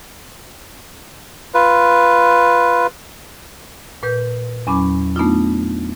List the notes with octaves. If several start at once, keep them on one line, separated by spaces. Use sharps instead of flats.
F4 B4
A#2 B4 G6
E2 F#3 C#4 G#5 B5 D6
A3 B3 D4 D#4 F4